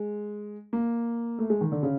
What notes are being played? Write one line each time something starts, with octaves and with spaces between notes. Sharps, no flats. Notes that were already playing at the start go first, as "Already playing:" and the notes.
Already playing: G#3
A#3
A3
G#3
D#3
D3
C#3